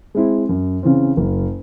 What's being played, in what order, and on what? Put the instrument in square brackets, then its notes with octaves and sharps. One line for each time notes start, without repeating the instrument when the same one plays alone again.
[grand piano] G#3 C4 E4
F#2
C#3 E3 C4
F#1